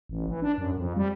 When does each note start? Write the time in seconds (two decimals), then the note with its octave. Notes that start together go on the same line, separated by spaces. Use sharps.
0.09 A1
0.29 E3
0.42 D4
0.58 F#2
0.77 F2
0.97 G3